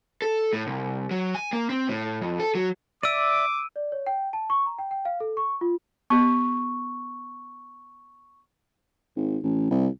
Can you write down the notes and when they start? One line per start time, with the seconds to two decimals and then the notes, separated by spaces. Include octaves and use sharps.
0.22 A4
0.53 A2
0.67 C2
1.11 F#3
1.35 G#5
1.53 A#3
1.70 C4
1.88 A2
2.22 F2
2.40 A4
2.55 F#3
3.03 D5 E5 D6 E6 D7 D#7
3.76 D5
3.92 C#5
4.07 G5
4.33 A5
4.50 C#6
4.66 A#5
4.79 G5
4.91 G5
5.05 F5
5.20 A4
5.37 C#6
5.61 F4
6.10 B3 G4 C#6
9.17 G#1
9.43 A1
9.71 C2